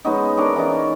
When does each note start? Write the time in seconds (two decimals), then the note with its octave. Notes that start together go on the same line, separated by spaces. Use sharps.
0.05 G#3 B3 C#4 D#4
0.38 C#4 D4 A#4
0.56 E3 C#4 D#4 D5